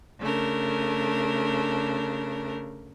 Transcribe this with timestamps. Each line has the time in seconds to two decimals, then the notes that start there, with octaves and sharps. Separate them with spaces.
0.20 C#3 A3 D4 A#4